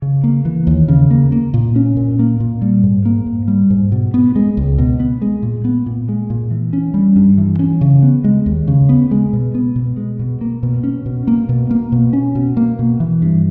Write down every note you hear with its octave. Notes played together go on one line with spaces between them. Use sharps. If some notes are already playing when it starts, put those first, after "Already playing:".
C#3
A#3
E3
D#2
C#3
A#3
A#3
A#2
C#4
A#2
A#3
A#2
G3
G#2
A#3
G#2
G3
G#2
B2
B3
G#3
C#2
B2
B3
G#3
A#2
B3
A#2
G#3
A#2
E3
C#4
G3
G2
E3
C#4
C#3
B3
G#3
D#2
C#3
B3
G#3
B2
B3
B2
G#3
B2
A#3
B2
C#4
B2
A#3
B2
A#3
B2
C#4
B2
A#3
B2
E3
G2